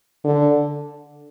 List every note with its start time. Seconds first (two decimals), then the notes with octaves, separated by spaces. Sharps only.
0.24 D3